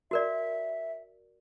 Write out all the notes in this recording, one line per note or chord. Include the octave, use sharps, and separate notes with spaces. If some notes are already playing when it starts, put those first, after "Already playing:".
F#4 A#4 D5 E5